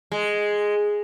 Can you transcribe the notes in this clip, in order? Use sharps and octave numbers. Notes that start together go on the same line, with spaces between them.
G#3